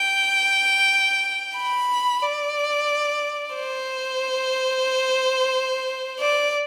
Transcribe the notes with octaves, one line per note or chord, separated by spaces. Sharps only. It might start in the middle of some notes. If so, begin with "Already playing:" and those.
Already playing: G5
B5
D5
C5
D5